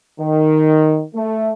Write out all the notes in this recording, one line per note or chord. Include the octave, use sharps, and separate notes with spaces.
D#3
A3